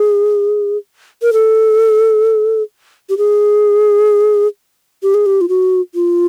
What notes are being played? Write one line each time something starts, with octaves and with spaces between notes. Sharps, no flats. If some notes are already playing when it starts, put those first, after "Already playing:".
Already playing: G#4
A#4
A4
G4
G#4
G4
G#4
G4
F4
F#4
F4